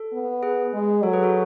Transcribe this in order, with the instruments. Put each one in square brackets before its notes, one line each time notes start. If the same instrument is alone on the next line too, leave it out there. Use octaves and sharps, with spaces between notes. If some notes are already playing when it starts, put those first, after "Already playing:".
Already playing: [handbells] A4
[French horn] B3
[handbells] G#4 B4
[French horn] G#3
[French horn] F#3 [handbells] A4 C#5
[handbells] G#4 B4
F#4 A4